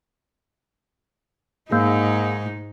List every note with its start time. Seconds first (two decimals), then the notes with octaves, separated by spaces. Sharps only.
1.71 G#2 A#3 D#4 G#4